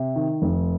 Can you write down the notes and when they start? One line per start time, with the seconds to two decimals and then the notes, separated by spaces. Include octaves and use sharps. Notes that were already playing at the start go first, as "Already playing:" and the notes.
Already playing: C3
0.16 D#3
0.42 F1